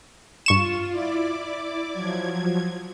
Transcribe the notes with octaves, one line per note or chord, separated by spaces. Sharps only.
G2 F4 C#6 E7
E4 D5 D6
F3 F#3 G#6